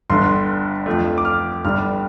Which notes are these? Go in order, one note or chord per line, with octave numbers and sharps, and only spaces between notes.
G1 G2 D3 C6
F2 F3 A3
D6
F6
G1 G2 G3 F6